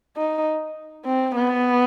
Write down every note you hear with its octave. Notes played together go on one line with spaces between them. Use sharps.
D#4
C4
B3